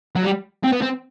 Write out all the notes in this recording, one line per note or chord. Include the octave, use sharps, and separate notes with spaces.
F#3
G3
C4
B3
C4